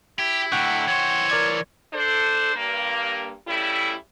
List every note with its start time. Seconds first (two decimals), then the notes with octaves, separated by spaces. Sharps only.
0.19 E4 G4
0.52 A2 D3 F#5 G5 C#6
0.87 E3 C5 C#5
1.30 A#4 D5 G#6
1.93 D4 A4 C5
2.55 G2 A#3
3.47 C#3 G3 A3 E4